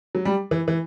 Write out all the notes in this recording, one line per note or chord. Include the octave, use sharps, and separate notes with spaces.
F#3
G3
E3
E3